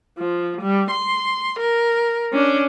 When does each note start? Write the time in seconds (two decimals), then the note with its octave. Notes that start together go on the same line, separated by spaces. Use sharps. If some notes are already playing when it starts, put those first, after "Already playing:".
0.19 F3
0.62 G3
0.91 C6
1.59 A#4
2.33 C#4 D4